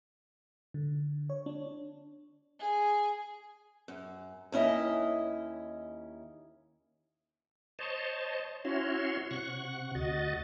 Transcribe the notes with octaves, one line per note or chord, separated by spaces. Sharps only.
D3
C#5
D4
G#4
F#2
D#2 C#4 E4 D#5
C5 C#5 D#5 A5
C#4 E4 F#4 C#5 C6
C3 F#5 C#6
D2 F#4 D#5 A6